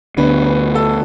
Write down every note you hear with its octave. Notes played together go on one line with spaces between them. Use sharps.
D2 D3 B3 D4 B4
B4
A4